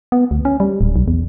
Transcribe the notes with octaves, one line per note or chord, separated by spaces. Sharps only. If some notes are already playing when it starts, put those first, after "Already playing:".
B3
D2
C#4
G3
D1
B1
E2